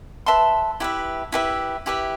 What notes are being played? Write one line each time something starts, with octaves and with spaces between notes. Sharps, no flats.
B4 E5 A5 C6
E4 G4 B4 E5
E4 G4 B4 E5
E4 G4 B4 E5